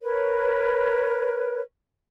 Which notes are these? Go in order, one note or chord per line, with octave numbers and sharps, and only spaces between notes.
A#4 B4 C#5